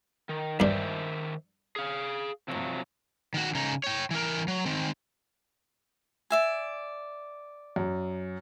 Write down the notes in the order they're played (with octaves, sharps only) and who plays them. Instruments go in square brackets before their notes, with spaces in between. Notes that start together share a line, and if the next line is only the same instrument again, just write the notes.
[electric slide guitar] D#3
[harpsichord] G2 D4 [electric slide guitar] D#3 C5 E5
[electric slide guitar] G#4 F5
C3 F3 F#3
[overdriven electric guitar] D#3 F#4
C#3 D#4
C#5 G5
E3 A#4
F#3
D#3 C4
[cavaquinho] D5 E5 G#5
[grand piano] F#2